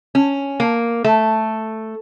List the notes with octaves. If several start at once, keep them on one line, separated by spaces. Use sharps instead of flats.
C#4
A#3
A3